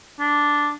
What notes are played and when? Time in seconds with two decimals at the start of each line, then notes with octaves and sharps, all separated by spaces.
0.20 D4